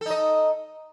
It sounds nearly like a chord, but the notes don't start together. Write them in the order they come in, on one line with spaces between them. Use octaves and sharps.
A4 D#4 D#5